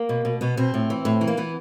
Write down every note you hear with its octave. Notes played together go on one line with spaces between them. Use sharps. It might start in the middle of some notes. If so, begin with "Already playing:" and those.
Already playing: A#3
B2
B2
B2 B3
B2 C4
A2
E3
A2
E3
A#3
E3 B3